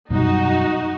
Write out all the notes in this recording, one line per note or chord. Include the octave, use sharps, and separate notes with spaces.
F#2 B2 G3 D#4 F#4